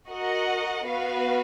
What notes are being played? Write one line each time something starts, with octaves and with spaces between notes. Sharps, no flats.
F#4 A#4 D#5 F#5
B3 F#4 B4 F5